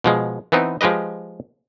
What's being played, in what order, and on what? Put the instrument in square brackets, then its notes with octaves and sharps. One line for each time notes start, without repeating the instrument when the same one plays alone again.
[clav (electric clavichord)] B2 F3 G#3
E3 B3 C4 D#4
F3 G#3 G4 B4 D#5